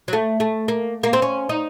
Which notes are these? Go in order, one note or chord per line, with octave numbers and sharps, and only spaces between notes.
F#3
A3
A3
A#3
A#3
C4
C#4
D#4